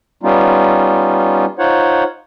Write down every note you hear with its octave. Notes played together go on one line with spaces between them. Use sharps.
G3 B3 C#4 D#4 F4
D#4 F4 C5 C#5 F#5